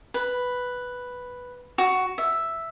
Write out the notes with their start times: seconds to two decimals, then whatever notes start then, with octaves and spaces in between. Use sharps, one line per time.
0.14 B4
1.78 F#4
2.18 E5